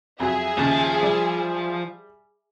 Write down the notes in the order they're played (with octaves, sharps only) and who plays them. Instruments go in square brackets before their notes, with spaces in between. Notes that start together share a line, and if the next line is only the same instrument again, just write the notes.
[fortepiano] F2 F#3 [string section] G#4 E5
[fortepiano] D#2 C#3 [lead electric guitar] F3 A5
[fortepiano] G3